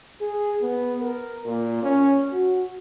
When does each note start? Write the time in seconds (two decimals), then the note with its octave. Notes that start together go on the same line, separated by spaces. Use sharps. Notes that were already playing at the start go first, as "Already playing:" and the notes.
0.21 G#4
0.62 B3
1.02 A#4
1.46 A#2
1.83 C#4
2.31 F#4